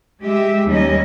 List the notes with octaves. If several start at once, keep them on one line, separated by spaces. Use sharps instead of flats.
G#3 G4 E5
D#2 G3 C#4 D#5